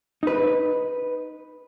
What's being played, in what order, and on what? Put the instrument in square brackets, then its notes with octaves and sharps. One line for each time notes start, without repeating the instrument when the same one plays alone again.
[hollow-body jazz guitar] D#4 B4